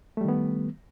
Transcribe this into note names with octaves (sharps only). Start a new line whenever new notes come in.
D#3 G3 A3 B3